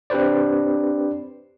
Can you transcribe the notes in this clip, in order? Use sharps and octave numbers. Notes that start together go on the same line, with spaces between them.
C4 D4 G4 B4 C5 D5